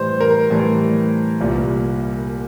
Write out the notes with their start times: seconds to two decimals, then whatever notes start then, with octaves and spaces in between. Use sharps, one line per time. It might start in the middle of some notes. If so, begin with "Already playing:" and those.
Already playing: A2 E3 G3 C5
0.20 A#4
0.50 A2 E3 G3
1.41 C2 A#2 G3